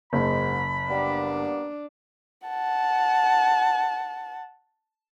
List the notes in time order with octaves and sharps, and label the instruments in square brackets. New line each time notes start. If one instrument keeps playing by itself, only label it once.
[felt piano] F#1 [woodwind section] G#2 [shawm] B5
[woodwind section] G3 A#3 B3 [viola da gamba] D4
[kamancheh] F#5 A5